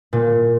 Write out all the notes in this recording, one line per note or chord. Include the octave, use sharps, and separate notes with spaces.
A#2